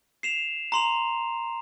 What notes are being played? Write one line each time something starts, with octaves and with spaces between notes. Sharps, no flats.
C7 E7 F7
A#5 C6 F7